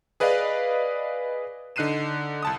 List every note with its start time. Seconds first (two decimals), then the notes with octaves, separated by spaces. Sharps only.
0.20 G#4 B4 D5 D#5 F5
1.76 D3 D#4 F#6 C7 D#7 E7
2.43 C2 A5 D#6